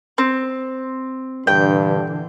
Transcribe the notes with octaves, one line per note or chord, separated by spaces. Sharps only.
C4
G2 A#2 D3 E3 G5